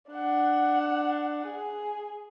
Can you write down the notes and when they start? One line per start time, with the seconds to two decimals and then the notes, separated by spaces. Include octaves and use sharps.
0.10 D4 F#5
1.46 G#4